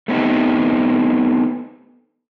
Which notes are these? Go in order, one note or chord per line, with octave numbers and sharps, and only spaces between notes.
A3 B3 C4 D#4 G4